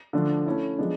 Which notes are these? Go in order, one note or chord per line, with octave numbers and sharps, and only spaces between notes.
D3 F3 A3 D4
A3 C#4 E4
F3 G#3 B3 D4